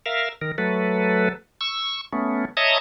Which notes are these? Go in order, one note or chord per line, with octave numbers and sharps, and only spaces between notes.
A#4 E5 F5
D#3 A#4
F#3 A3 A4 B4
C#6 E6
A3 B3 C#4
C#5 D#5 E5 A5 A#5 D#6